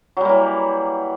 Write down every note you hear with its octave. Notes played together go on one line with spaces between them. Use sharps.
E3 F#3 G3 A#3